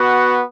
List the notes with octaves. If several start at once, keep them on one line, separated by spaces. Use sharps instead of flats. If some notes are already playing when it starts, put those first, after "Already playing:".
Already playing: B3 F#4